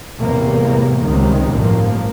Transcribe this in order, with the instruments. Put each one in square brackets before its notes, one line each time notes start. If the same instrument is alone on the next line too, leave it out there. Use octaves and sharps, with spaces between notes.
[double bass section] E2 A2 C3 G3 A#3
C#2 C3 D#3 G3
A1 G2 F3 A#3